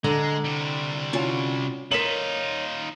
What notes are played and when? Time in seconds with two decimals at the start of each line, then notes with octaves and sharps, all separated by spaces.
0.04 D3 G#3 A#5
0.45 C3 G3
1.13 C#4 F4 F#4
1.91 D#4 F4 A#4 C#5 B6 E7 F#7